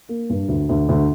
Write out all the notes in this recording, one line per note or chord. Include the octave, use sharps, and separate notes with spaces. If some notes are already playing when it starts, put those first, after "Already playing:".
A#3
G2
D2
D2
D2